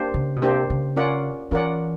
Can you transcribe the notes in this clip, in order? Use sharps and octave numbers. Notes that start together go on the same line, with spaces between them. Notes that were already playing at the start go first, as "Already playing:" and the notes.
Already playing: A#3 D4 G4 C5
C#3
B2
C3 A#3 D4 G4 C5
C#3
C#4 F4 A#4 D5 F#5
E3 C#4 F4 A#4 D5 F#5